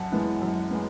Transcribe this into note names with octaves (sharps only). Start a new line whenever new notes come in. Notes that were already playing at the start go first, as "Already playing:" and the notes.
Already playing: F#2 F#5 A5
E3 G#3 B3
F#2
G#3 B3